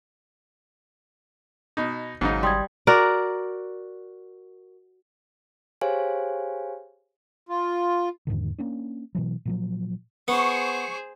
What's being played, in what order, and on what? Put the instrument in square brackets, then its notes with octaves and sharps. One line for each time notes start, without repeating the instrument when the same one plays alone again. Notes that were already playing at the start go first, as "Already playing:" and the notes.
[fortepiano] B2 D#4
[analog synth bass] G#1 [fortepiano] G#2 C#3 D#4 [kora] F#3
[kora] G3 [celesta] C6 D#6 G#6
[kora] F#4 A#4 D5
[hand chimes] G4 G#4 C5 C#5 F5 G#5
[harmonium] F4
[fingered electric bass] E2 G#2 D3 D#3
A#3 C#4 D4
B2 E3 F#3
A#2 F3 F#3
[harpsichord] B3 [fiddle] G#4 C5 [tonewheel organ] C#6